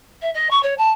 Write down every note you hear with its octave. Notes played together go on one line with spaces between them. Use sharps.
E5
D#5
C#6
C#5
A5